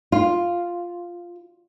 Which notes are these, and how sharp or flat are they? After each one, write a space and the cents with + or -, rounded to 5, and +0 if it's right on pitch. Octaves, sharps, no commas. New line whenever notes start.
F4 +0